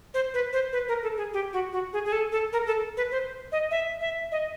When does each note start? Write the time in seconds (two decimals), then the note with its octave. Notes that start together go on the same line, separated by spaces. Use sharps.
0.14 C5
0.34 B4
0.53 C5
0.73 B4
0.88 A#4
1.03 A4
1.17 G#4
1.33 G4
1.53 F#4
1.73 F#4
1.93 G#4
2.05 G#4
2.12 A4
2.32 A4
2.53 A#4
2.66 A4
2.97 B4
3.11 C5
3.52 D#5
3.71 E5
4.01 E5
4.32 D#5